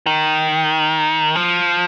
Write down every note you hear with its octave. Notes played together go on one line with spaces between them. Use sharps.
D#3
F3